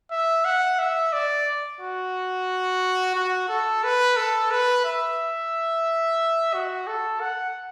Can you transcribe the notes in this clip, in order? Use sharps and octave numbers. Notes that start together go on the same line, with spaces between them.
E5
F#5
E5
D5
F#4
F#4
A4
B4
A4
B4
E5
F#4
A4
F#5